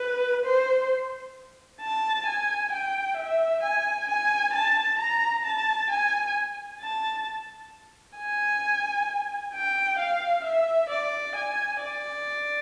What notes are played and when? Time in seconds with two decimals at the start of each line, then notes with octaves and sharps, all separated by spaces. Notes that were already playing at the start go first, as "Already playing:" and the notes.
Already playing: B4
0.45 C5
1.81 A5
2.26 G#5
2.72 G5
3.17 E5
3.63 G#5
4.08 G#5
4.54 A5
4.99 A#5
5.45 A5
5.90 G#5
6.81 A5
8.18 G#5
9.54 G5
9.99 F5
10.45 E5
10.90 D5
11.36 G#5
11.81 D5